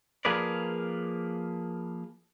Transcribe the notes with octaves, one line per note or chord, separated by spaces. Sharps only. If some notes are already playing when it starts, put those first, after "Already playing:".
F3 A#3 G#4 A#4 B4 D5